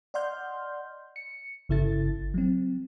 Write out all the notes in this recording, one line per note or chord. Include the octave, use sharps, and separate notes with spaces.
D5 D#5 F#5 C6 F6 G6
C#7
G1 C#3 E4 A4 A6
F#3 C4